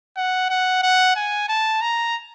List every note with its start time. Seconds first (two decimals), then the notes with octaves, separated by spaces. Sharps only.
0.17 F#5
0.49 F#5
0.83 F#5
1.16 G#5
1.48 A5
1.81 A#5